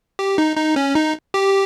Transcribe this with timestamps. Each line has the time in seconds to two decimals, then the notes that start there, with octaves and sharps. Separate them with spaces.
0.19 G4
0.38 D#4
0.57 D#4
0.76 C#4
0.95 D#4
1.34 G4